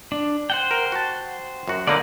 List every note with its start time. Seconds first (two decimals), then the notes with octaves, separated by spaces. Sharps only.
0.12 D4
0.50 C5 F#5 G5
0.71 A#4
0.92 F#4 A5
1.68 F#2 F#4
1.87 D3 A#3 D#4 A#4 B4 D5